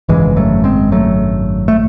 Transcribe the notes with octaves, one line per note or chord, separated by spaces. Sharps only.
G#1 F#2 C#3 E3 G#3
F#3 A3
G#3 C4
F#3 A3
A3